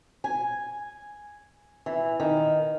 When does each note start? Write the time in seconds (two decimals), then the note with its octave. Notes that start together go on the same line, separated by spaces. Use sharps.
0.24 G#5
1.86 E3
2.20 D#3